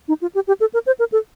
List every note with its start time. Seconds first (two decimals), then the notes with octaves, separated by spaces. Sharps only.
0.08 D#4
0.22 F4
0.35 G4
0.48 G4
0.60 A4
0.74 A#4
0.87 C5
0.99 A#4
1.12 A4